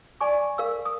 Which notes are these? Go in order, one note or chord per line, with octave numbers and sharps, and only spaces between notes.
D5 G#5 C#6 D6
A#4 F5 E6
D#6